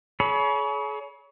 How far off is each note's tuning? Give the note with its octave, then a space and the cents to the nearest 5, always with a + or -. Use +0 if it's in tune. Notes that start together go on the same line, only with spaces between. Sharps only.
G#4 +40 C#5 +30 B5 -25